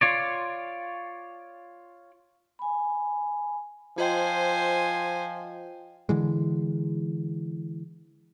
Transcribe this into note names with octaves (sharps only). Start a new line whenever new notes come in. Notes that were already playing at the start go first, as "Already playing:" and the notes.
F4 C#5 D5
G#5 B5
F3 F4 C5 D#5 G5 G#5
D3 E3 G#3